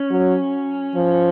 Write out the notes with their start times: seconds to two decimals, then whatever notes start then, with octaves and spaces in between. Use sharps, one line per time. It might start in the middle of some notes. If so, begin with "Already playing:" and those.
Already playing: C#4
0.10 F#3
0.95 F3